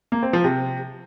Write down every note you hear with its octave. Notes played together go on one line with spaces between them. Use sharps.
A#3
C4
F3
C3